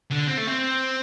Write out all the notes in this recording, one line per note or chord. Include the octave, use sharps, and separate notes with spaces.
D3
C4
A3
C4